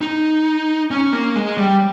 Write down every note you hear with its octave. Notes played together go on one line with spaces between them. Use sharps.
D#4
C#4
A#3
G#3
G3